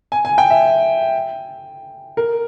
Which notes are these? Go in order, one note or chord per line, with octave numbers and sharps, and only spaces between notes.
G#5
G#5
G5
E5
A#4